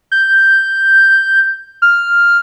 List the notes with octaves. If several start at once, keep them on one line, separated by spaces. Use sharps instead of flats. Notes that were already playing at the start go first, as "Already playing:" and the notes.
G6
F6